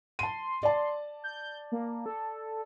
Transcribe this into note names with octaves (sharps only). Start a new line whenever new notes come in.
A5 C6 D#7
D5 A5
G6
A#3
A4